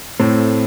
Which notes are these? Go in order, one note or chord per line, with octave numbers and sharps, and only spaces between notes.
A2 A3 C4